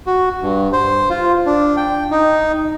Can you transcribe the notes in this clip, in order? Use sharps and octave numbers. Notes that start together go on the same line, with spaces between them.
F#4
G2
C5
F4
D4
G5
D#4